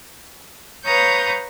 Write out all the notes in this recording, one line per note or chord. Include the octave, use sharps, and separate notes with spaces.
B4 C#5 F5 A#5 D#6 G6